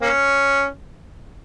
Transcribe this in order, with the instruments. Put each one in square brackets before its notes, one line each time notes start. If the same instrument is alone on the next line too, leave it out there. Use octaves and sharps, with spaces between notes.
[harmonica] A#3 C#4